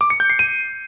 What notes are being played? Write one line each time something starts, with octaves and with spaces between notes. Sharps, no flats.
D6
C#7
G6
C7
D#7